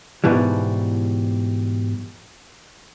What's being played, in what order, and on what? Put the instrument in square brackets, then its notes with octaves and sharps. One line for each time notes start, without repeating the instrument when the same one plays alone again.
[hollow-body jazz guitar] G#2 B2 E3 G3